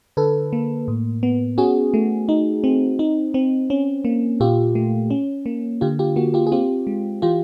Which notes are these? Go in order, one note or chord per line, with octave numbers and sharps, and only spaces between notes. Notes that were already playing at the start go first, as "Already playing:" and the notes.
D3 A4 B4
A#3
A2
B3
C#4 F#4 G#4
A3
D#4
C4
D#4
C4
C#4
A#3
A#2 F4 G4
A3
C#4
A#3
D3 F4 G4
F4 G4
A#3 F#4
F4 G4
G#4
C4 F4 G4
G#3
E3 F4 G4